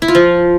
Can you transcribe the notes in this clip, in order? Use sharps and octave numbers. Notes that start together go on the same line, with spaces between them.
E4
F4
F3